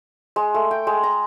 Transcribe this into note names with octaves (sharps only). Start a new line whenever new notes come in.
G#3
A3
G5
G#3
A#5